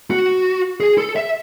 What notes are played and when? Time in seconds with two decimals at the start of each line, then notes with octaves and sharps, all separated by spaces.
0.11 F#4
0.80 G#4
0.98 A4
1.16 E5